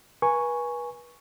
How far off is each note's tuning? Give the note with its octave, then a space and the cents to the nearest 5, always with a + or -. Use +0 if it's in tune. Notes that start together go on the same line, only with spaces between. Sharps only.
B4 -35 G#5 +0 C#6 +0